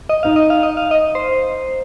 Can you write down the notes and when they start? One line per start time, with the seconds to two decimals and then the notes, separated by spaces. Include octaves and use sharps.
0.09 D#5
0.23 D#4 F5
0.36 D#5
0.50 F5
0.63 D#5
0.77 F5
0.91 D#5
1.15 C5